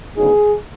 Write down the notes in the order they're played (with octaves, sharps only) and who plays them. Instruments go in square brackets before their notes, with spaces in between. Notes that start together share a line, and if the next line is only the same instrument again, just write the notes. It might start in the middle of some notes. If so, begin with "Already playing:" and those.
[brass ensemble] D2 C#3 F#3 B3 D#4 G#4